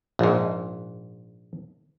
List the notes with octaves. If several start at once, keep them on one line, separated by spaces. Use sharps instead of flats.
A#1 G#2